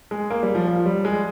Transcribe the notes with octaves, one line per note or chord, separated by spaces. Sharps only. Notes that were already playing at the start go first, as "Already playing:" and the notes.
G#3
A#3
G3
F3
F3
G3
G#3